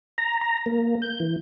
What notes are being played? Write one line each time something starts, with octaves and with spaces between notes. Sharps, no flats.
A#5
A#5
A#3
G6
E3